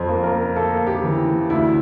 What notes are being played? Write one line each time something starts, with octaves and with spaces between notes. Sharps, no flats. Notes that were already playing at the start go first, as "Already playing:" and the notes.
Already playing: F2 C5
A#3
A#4
A#3 A4
G4
E3
D2 E4